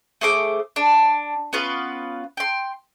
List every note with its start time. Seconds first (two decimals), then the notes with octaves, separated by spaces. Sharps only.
0.21 A3 G#4 C5 D6
0.76 D4
1.53 B3 C#4 F4 B4
2.37 G5 C6